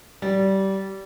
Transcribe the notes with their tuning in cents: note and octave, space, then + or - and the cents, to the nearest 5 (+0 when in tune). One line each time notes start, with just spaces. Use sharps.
G3 -20